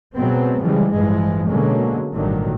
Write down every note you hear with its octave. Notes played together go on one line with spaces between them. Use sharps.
B2 F#3 G#3 B3 C4
C#3 E3 F3 G3 G#3
A1 G2 E3 F3 G#3
B2 D3 F#3 G#3 A#3 C#4
G#1 G2 A#2 D3 D#3 F#3